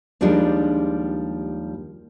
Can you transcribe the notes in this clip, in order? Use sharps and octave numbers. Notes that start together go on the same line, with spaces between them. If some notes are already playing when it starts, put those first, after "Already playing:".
D#2 F3 G3 G#3 D4 D#4